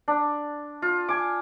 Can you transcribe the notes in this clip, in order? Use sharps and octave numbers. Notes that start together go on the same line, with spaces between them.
D4
F4
G#5 D6